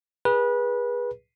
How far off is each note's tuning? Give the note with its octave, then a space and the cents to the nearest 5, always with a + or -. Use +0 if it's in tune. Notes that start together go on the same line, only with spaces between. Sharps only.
G#4 -20 B4 -25